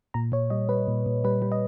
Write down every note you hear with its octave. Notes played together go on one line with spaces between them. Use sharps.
A#2 A#5
A#2 C#5
G3 D#5
G3 B4
A#2
A#2
G3 B4
G3
D#5